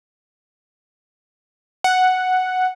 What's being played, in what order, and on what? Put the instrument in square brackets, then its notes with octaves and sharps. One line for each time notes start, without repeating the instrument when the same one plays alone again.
[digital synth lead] F#5